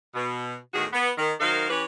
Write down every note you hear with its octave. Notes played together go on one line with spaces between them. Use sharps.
B2
E2 A2 D#3 F#4 G#4
B3
D#3
D#3 F#3 D#4 A#4 C5 F5
E3 C#4 G4 B4 C#5